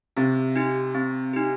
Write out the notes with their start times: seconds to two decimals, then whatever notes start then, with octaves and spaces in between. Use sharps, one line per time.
0.17 C3 C4
0.56 D#4 G4
0.94 C4
1.33 D#4 G4